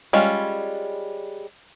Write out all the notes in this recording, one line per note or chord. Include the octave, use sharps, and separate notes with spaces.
G3 G#3 C#4 F4